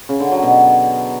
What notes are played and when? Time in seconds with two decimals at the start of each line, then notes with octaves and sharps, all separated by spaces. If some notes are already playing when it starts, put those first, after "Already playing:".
0.09 C#3
0.20 D3
0.31 F#3
0.43 B2